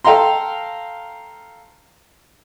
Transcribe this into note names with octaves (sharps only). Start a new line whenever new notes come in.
A4 F5 G5 A#5 C6